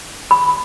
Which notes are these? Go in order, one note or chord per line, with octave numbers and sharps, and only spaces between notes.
B5